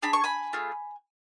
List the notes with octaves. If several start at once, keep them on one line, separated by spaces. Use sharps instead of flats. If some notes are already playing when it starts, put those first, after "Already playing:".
D4 G#4 B5
C#6
G#5 B5
A3 F4 G#4